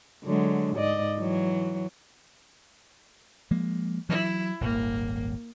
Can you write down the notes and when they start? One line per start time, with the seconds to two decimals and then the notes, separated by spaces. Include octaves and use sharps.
0.24 D3 F#3 G#3
0.77 G#2 D5 D#5
1.18 E3 F#3
3.51 F3 G#3 A#3
4.09 E3 F#3 E4
4.61 D#1 G#1 A#3